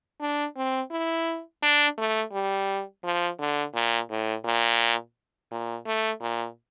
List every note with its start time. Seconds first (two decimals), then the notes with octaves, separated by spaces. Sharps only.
0.20 D4
0.57 C4
0.91 E4
1.62 D4
1.98 A3
2.32 G3
3.04 F3
3.39 D3
3.74 A#2
4.10 A2
4.44 A#2
5.51 A#2
5.86 A3
6.21 A#2